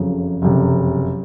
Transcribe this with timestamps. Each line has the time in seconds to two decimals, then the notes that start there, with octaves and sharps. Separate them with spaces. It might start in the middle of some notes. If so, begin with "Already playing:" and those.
Already playing: F#1 F2 C#3 F#3
0.42 F#1 F2 C3